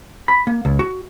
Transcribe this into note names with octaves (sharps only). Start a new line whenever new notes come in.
B5
A#3
C#2
F#4